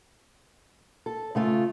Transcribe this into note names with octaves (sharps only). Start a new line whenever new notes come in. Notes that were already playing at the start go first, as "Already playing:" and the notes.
A4
C#3 A3 F4